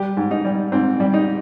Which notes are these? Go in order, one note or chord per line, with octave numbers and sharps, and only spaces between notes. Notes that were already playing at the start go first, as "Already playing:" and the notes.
Already playing: G3 G4
G#2
D#4
G3
G#2 C4
G3
D#4